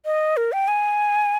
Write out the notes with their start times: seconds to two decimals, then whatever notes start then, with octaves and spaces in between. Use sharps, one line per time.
0.05 D#5
0.37 A#4
0.52 G5
0.68 G#5